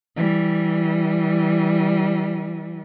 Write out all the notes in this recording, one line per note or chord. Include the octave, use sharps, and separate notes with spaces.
E3 G3